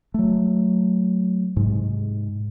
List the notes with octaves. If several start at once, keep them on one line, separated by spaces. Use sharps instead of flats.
F#3 A3
G#2 C3 G#3